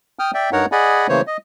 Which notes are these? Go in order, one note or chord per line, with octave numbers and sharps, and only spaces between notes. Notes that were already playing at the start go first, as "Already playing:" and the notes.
G5 D#6 F6
D5 E5 G5
G2 D#4 A#4 C#5 F#5 A#5
G#4 D5 D#5 F#5 G#5 B5
C#3 E3 A3 A#3 C5 C#5
D#5